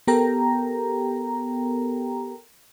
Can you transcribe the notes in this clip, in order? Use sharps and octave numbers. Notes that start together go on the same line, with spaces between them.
B3 G4 A4 A#4 G5 A#5